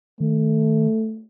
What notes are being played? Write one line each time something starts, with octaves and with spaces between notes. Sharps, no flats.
D#3 A3